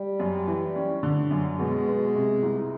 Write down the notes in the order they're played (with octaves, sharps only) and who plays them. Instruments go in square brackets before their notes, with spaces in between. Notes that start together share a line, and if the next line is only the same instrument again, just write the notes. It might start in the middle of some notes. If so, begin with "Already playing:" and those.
Already playing: [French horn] G3
[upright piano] F#2
E3
C#4
D3
F#2
[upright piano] B2 [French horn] G#3
[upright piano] B3
C3
C2